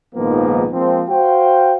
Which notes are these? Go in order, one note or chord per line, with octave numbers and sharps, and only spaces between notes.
A#1 G#2 D#3 F3 A#3 B3
F3 G#3 A#3 C4
F#4 C5 F5 G5